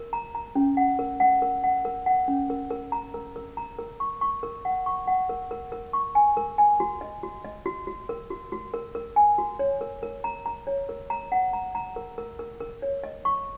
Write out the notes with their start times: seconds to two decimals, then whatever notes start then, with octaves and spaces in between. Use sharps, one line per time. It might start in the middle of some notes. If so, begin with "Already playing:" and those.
Already playing: A#4
0.13 A#5
0.35 A#5
0.55 C#4
0.77 F#5
0.99 A#4
1.20 F#5
1.42 A#4
1.64 F#5
1.85 A#4
2.06 F#5
2.28 C#4
2.50 A#4
2.71 A#4
2.92 A#5
3.14 A#4
3.36 A#4
3.57 A#5
3.79 A#4
4.00 C#6
4.21 C#6
4.43 A#4
4.65 F#5
4.86 C#6
5.08 F#5
5.29 A#4
5.51 A#4
5.72 A#4
5.93 C#6
6.15 G#5
6.37 A#4
6.58 G#5
6.80 F#4
7.01 D#5
7.23 F#4
7.44 D#5
7.66 F#4
7.87 F#4
8.09 A#4
8.30 F#4
8.52 F#4
8.74 A#4
8.95 A#4
9.16 G#5
9.38 F#4
9.59 C#5
9.81 A#4
10.03 A#4
10.24 A#5
10.46 A#5
10.67 C#5
10.89 A#4
11.10 A#5
11.32 F#5
11.53 A#5
11.75 A#5
11.96 A#4
12.18 A#4
12.39 A#4
12.61 A#4
12.82 C#5
13.04 D#5
13.25 C#6